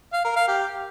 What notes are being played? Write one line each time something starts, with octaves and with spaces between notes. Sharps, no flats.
F5
A#4
F5
G4